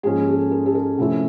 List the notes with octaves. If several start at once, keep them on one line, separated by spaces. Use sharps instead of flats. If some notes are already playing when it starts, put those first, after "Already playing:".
G#2 F3 A#3 C#4 G#4
A4
A#4
A4
A#4
C3 F3 A3 C#4 E4